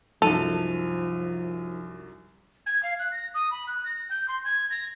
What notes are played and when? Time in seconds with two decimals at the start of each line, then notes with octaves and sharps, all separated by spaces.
0.22 C2 F#2 F3 D#4 A4 D#7 F7
2.66 G#6
2.83 F5
2.99 F#6
3.11 A#6
3.34 D#6
3.51 B5
3.67 F#6
3.85 A#6
4.09 G6
4.28 C6
4.45 G#6
4.70 A#6